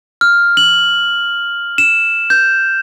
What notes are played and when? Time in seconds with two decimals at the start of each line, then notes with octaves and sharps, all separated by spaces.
0.21 F6
0.57 F#7
1.78 E7
2.30 G6